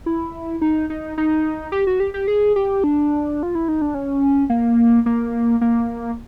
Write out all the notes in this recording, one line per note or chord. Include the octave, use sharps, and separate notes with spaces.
E4
D#4
D#4
D#4
G4
F#4
G4
G4
G#4
G4
D4
F4
E4
D#4
D4
C#4
A#3
A#3
A#3